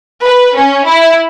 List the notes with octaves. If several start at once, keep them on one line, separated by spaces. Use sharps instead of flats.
B4
C#4
E4